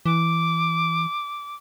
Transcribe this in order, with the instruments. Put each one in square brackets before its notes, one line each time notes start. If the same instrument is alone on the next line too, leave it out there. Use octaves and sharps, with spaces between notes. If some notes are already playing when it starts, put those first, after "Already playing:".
[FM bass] E3 [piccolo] D6